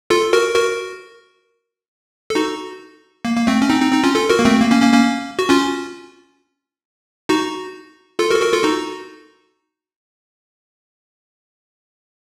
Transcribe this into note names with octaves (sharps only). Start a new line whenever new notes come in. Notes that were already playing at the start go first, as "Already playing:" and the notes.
F4 A4
F#4 A#4
F#4 A#4
A4
D#4 F#4
A#3
A#3
A3 C4
C#4
C4 D#4
C4 D#4
C4 D#4
C#4 F4
F4 A4
F#4 A#4
A#3
A3 C4
A#3
A#3 C#4
A#3 C#4
A#3 C#4
F#4
C#4 F4
D#4 F#4
F4 A4
F#4 A#4
A4
F#4 A#4
F4 A4
D#4 F#4